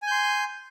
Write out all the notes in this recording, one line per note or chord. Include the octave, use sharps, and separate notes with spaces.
G#5 C6 G6